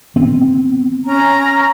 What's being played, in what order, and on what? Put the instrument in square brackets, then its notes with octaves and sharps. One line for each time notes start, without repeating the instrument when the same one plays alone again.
[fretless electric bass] B3 C4
[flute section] C#4 A#5